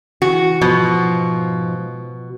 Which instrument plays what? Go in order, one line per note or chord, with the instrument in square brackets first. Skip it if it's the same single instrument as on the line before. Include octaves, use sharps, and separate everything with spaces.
[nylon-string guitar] E3 [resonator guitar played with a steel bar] F#4
[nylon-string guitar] G#2 F3 [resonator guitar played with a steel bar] B2